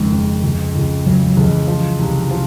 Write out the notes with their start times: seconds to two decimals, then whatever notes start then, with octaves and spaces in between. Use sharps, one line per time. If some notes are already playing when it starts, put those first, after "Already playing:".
Already playing: F#1 F2 D#3 G#3
0.12 F2
0.44 C#2
0.75 C#2
1.06 C#3 F#3
1.26 F#3
1.37 C#2
1.47 E3
1.68 F3
1.99 C2
2.31 F3